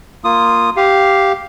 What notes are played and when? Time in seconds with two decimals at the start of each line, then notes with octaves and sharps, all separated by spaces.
0.24 A#3 F4 D#6
0.76 G4 F5